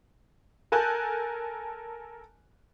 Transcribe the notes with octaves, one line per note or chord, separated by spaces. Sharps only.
A4 A#4 G#5 A5 F#6 G6